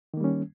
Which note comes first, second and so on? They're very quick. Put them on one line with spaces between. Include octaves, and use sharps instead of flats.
D#3 A#3 G3 C#4